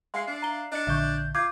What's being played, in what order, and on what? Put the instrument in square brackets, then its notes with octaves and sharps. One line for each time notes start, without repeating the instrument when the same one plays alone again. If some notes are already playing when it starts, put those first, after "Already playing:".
[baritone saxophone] G#3 [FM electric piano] E5 F5 C7 [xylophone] C6
[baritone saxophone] D4
[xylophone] A#5 G7
[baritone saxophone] D4 [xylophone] D#5 C#7
[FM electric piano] A#1 D3 G6 [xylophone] E5 C#6
[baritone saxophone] F4 [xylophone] D6 G6 G#6